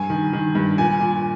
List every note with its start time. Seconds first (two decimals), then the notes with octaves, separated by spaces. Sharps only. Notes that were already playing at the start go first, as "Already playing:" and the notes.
Already playing: G2 G#5
0.10 D#3
0.33 D#3
0.55 G2
0.78 A#2 G#5
1.00 A#2